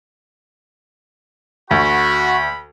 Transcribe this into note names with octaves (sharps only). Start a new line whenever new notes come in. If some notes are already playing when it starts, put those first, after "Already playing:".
D2 F#4 B5